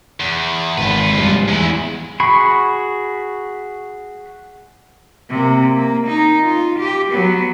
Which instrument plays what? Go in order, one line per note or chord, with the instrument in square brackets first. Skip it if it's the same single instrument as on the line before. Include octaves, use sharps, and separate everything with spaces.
[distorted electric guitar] E2
[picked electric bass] G#1 [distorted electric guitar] F4 B4
[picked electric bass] F1 G#2 G3
[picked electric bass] E2 [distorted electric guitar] G#2 E4
[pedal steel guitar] F#4 G#4 B5 C#6
[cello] C3 A#3
A#3
D#4
F4
G4
F#3 B3